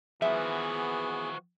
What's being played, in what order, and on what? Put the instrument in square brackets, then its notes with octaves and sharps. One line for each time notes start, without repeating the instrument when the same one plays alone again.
[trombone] E3 [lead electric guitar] F3 F#4 [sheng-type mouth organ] B3 G#4 [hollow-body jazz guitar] E5